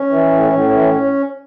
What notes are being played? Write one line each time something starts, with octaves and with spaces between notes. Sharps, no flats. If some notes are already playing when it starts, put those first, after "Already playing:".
Already playing: C#4
E3
A2
A2
E3